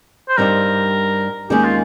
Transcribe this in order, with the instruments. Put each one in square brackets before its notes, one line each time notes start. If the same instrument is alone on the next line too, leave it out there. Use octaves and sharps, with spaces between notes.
[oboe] C5
[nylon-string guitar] G2 G3 C4 D#4 G4 [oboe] A#4
[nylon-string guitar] D#2 D#3 G#3 C#4 G#4 [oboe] G4
[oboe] F4